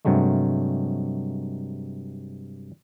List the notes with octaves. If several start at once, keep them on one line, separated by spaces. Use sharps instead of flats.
G2 C3 F#3 G#3 A3